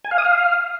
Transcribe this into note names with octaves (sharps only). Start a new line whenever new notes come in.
G#5
F5
D#6
F5